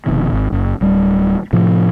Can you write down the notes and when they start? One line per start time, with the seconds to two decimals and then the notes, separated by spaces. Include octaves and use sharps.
0.06 F1 F2 B2 D#3
0.33 G#1
0.52 F#1
0.81 D1 G3
1.53 A2 C3 F3